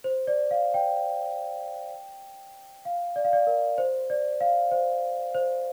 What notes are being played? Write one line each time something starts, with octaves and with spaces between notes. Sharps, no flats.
C5
D5
F5
G5
F5
D5
F5
D5
A#4
C5
D5
F5
C5
C5